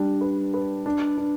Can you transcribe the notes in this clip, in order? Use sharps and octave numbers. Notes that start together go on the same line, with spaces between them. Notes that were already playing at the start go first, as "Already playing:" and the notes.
Already playing: G3 D4
B4
B4
D4
D4